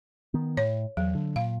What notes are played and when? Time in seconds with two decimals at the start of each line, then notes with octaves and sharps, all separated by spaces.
0.34 D#3 B3
0.57 A2 C#5
0.97 E2 F#3
1.15 D3
1.36 A#2 F5